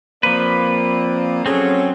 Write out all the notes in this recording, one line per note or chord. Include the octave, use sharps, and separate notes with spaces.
F3 A#3 C4 B4 D5
F#3 C4 C#4 G#4 A4